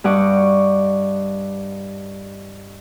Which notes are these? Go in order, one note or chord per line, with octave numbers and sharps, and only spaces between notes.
G2 G4 D#5 F#5 C#6 D6